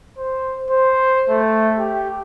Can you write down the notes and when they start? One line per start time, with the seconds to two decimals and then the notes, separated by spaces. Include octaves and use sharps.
0.18 C5
0.70 C5
1.29 A3
1.79 G4